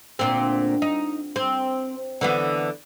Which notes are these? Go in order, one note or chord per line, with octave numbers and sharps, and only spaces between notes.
D2 A#2 C4
D#4
C4
D3 E3 B3